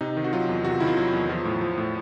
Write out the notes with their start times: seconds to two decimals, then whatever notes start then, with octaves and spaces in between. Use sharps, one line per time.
0.01 C3 D#4
0.17 D#3
0.24 F#4
0.33 F#3 F4
0.49 E2
0.65 C3 F#4
0.72 F4
0.80 D#3 E4
0.87 F4
0.97 F#3
1.13 E2
1.29 F3
1.45 A2
1.61 F3
1.78 A2